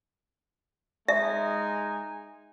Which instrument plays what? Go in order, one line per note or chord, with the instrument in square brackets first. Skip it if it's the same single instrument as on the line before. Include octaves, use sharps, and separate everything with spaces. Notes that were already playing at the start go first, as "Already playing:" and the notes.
[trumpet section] G#3 D#4 G#5 [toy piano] E5